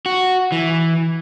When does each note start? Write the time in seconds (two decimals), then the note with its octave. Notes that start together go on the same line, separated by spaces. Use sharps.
0.06 F#4
0.52 E3